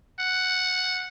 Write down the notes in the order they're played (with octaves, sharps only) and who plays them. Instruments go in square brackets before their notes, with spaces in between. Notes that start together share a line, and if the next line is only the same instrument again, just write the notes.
[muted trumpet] F#5